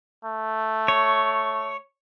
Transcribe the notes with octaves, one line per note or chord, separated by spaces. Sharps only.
A3
C#5